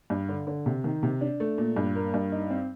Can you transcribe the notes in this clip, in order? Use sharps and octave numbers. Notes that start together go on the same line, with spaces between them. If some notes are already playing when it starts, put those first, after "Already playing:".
G2
D3
D3
C3
D#3
C3
D4
A3
A#2
G2
A#3
G2
D#4
C4